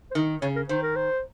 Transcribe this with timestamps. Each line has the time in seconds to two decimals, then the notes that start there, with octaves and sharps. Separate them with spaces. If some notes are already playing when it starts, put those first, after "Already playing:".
0.11 C5
0.15 D#3 A#4
0.42 C#3 C#5
0.56 A#4
0.69 D#3 C5
0.83 A#4
0.96 C5